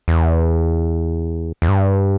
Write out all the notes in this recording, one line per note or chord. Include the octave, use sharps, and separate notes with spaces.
E2
E2
G2